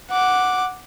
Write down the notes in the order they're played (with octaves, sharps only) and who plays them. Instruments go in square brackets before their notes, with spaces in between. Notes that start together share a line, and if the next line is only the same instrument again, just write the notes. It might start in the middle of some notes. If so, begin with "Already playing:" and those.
[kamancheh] F#5 D6